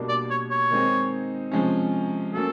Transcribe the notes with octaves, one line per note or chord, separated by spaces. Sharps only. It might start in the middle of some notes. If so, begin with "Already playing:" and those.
Already playing: B2 G3 A#3 D4
D5
C#5
C#5
D#3 G#3 C4 D#4
C3 F3 G#3 C#4
F#3 A#3 C#4 A4